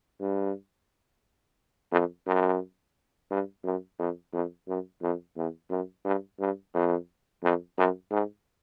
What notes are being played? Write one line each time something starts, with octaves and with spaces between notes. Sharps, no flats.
G2
F2
F#2
G2
F#2
F2
F2
F#2
F2
E2
F#2
G2
G2
F2
F2
F#2
G#2